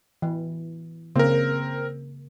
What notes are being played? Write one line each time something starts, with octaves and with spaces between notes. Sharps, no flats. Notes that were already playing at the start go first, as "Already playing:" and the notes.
E3
C#3 A#3 C4 A#4